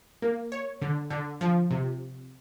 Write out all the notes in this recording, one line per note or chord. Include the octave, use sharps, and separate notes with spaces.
A#3
C#5
D3
D3
F3
C3